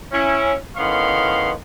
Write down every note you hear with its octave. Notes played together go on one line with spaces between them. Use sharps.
C#4 E4
A2 D#3 B3 C#4 F5 C6